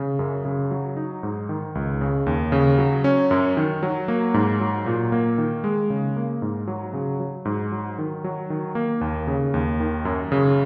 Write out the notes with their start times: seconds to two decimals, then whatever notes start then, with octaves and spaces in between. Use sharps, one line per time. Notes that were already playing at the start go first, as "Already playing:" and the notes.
Already playing: C#3
0.19 F#2
0.45 C#3
0.71 F#3
0.96 D#4
1.23 G#2
1.49 D#3
1.75 C#2
2.01 C#3
2.26 D#2
2.52 C#3
2.78 F#3
3.04 C#4
3.31 F#2
3.57 D#3
3.83 F#3
4.08 A#3
4.34 G#2
4.60 F#3
4.86 A#2
5.12 A#3
5.38 D#3
5.64 G#3
5.90 C#3
6.17 A#3
6.42 G#2
6.67 F#3
6.93 C#3
7.20 F#3
7.45 G#2
7.72 F#3
7.98 D#3
8.24 F#3
8.50 D#3
8.75 A#3
9.01 D#2
9.27 C#3
9.54 D#2
9.80 D#3
10.05 F#2
10.32 C#3